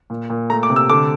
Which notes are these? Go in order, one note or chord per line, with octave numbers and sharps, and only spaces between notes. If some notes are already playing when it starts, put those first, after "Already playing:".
A#2
A#2
A3 A#5
D6
C3
E6
D3 D6